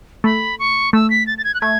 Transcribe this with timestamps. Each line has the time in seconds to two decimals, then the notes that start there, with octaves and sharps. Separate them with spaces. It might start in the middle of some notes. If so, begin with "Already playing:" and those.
0.24 A3 B5
0.59 C#6
0.93 A3 E6
1.10 B6
1.27 A6
1.38 A6
1.44 G#6
1.54 F#6
1.61 A3 G#6